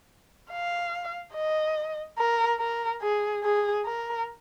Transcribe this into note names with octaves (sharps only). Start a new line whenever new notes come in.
F5
D#5
A#4
A#4
G#4
G#4
A#4